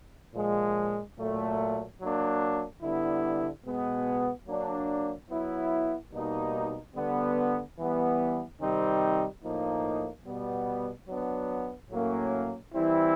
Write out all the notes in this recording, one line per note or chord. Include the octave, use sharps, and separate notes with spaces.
A#2 F3 G#3
A#2 F#3 A3
F#3 A#3 D4
D3 G3 B3 E4
B2 G#3 B3
F#3 A#3 D4
F#3 B3 E4
B2 G3 A#3 D#4
D3 G3 B3
E3 G3 B3
C3 D#3 G3 C4 D#4
A2 F3 A#3 D#4
B2 G3 B3
F#3 B3 D4
A2 F#3 A#3 C#4
E3 G3 C4 E4